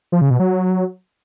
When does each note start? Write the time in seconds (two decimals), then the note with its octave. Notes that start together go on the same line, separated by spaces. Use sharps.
0.12 F3
0.21 C#3
0.30 B2
0.40 F#3